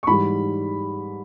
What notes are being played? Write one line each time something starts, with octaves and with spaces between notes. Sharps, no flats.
C#6
G#2 E3 G3 B5